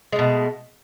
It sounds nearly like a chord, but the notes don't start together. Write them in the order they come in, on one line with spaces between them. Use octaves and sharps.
G#3 A3 B2